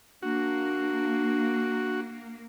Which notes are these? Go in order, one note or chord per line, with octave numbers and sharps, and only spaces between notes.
A#3 D4 F#4